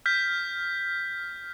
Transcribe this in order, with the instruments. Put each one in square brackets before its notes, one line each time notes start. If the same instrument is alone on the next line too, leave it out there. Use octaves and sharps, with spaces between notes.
[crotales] F6 G6 B6